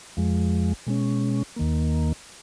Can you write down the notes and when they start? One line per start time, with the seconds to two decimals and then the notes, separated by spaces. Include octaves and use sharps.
0.17 F2 F3 G#3
0.87 B2 G#3 C#4
1.56 D#2 D#3 A#3